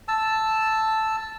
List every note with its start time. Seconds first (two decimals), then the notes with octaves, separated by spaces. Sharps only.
0.08 A5 E6